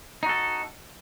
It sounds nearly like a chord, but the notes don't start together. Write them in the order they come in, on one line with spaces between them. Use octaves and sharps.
D#4 F#4 A4